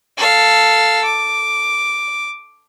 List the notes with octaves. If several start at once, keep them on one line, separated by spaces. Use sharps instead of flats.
A4 F5
D6